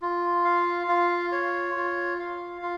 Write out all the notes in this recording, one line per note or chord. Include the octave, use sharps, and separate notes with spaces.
F4
F5
F4
C#5
F4
F5
F4